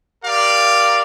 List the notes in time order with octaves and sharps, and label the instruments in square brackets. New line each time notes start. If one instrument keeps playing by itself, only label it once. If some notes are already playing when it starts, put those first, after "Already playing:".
[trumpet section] G4 A#4 D5 F5